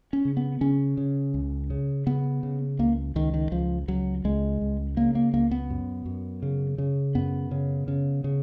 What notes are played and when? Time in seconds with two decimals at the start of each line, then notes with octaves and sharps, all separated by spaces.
0.13 C#4
0.25 C#3
0.37 B3
0.61 C#3 C#4
0.97 C#3
1.34 C#2
1.70 C#3
2.06 C#3 B3
2.43 C#3
2.79 C#2 A#3
3.15 C#2 D#3
3.34 D#3
3.52 C#2 F3
3.88 C#2 F#3
4.24 C#2 G#3
4.61 C#2
4.97 C#3 A#3
5.15 A#3
5.33 C#2 A#3
5.51 B3
5.70 F#2
6.06 F#2
6.42 C#3
6.78 C#3
7.15 F#2 B3
7.51 C#3
7.88 C#3
8.24 C#3